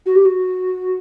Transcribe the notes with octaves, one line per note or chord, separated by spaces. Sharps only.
F#4
G4
F#4